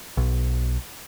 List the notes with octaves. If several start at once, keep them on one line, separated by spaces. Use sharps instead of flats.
B1